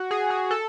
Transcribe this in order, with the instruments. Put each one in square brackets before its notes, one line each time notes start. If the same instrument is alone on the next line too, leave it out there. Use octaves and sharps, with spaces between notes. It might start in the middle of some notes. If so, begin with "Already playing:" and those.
Already playing: [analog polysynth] F#4
G#4
G#4
A4